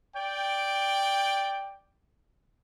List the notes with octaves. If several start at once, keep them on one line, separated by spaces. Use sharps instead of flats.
D5 G5